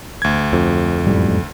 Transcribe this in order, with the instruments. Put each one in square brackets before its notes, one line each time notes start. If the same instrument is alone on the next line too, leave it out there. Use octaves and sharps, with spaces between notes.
[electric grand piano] D2 G#6
[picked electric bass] F2
[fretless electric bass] F#2 A2 G3